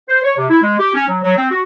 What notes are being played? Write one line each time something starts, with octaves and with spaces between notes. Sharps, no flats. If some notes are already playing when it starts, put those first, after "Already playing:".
C5
C#5
C3
E4
G#3
G4
C#4
F#3
F#3
C4
F#4